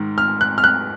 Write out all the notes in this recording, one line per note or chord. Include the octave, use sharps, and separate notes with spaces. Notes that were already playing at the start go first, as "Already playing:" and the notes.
Already playing: G#2 D#3
F6
F#6
F6
F#6